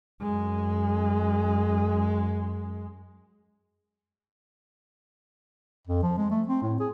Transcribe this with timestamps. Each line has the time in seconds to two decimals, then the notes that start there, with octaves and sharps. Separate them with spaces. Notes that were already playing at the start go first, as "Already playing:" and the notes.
0.22 F#2 G#3
5.87 F2
6.03 F3
6.18 G#3
6.31 A3
6.48 C4
6.62 A2
6.80 G#4